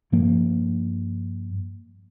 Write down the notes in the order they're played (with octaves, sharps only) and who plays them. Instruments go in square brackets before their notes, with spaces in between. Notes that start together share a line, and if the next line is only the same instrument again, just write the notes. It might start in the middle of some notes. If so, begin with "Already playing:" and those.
[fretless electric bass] G2 F3 A#3